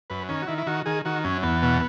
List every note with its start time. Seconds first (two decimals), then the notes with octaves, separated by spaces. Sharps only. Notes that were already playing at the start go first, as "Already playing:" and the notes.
0.10 F#2 B4
0.29 D#3 C#4
0.42 F#4
0.47 D#3 E4
0.58 E4
0.67 D#3 F#4
0.86 D#3 G#4
1.05 D#3 F#4
1.24 F#2 C#4
1.43 E2 B3
1.63 B2